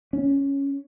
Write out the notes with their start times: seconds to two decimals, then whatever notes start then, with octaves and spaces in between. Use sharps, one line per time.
0.13 C#4